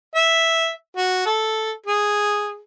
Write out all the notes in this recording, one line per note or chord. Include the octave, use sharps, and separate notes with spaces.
E5
F#4
A4
G#4